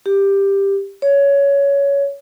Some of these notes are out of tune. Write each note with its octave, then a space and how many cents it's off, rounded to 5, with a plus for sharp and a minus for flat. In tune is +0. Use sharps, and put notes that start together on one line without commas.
G4 +10
C#5 +15